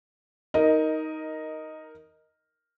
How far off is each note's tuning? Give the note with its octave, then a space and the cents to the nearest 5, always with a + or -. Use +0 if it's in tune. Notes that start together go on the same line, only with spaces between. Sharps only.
D#4 +15 A#4 +0 D#5 +0